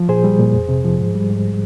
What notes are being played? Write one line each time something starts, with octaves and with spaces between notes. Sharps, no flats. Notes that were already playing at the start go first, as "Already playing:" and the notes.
Already playing: F3
A#2 G#4 C5
G3
A#2
F2
C3
F3
G#2
G3
G#2